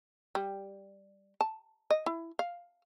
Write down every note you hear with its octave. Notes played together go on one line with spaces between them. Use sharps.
G3
A5
D#5
E4
F5